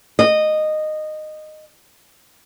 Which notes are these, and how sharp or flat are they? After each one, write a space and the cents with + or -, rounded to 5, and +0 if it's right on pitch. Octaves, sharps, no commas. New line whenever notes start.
D#5 -15